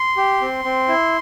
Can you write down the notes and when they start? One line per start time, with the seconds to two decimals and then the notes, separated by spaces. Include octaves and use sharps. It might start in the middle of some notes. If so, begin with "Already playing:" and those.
Already playing: C6
0.17 G4
0.42 C4
0.64 C4
0.88 E4